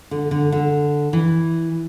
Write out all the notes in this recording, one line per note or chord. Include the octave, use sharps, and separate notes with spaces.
D3
D3
D3
E3